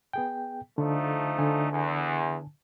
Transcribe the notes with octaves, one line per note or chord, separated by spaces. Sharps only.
B3 G#4 G5
D3 F3 A3 D#4
D3 G#5 A5
E2